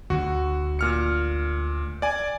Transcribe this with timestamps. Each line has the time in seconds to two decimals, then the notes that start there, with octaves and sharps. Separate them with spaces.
0.10 D2 D3 F#4
0.79 A#2 F6 C#7
2.02 D5 G#5